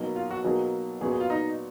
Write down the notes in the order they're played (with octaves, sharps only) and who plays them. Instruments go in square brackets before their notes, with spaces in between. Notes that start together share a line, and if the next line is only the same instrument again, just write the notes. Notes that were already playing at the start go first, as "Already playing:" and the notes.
Already playing: [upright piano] B2 F#3 A#3 D#4
[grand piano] F4
F#4
[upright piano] B2 F#3 A#3 D#4 [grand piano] G#4
[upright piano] A#2 F#3 B3 F#4 [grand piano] G#4
[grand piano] G#4
F4
D#4